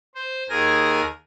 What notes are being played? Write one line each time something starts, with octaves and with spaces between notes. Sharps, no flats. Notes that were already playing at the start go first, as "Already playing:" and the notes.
C5
D#2 G#4 A#4 G#5 A#6